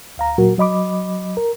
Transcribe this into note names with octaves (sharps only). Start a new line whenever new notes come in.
D2 F5 A#5
A#2 F#3 F#4 A#4
F#3 D#5 B5 D6
A#4